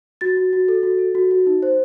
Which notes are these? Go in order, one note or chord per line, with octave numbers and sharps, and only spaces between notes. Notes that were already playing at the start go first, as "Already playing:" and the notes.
F#4 A6
F#4
F#4
A4
F#4
A4
F#4
F#4
D#4
C5